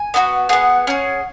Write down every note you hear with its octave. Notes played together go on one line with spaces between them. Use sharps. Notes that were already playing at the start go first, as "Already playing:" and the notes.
Already playing: G#5
B3 D#4 F#4
B3 G#4 F#5
C#4 G#4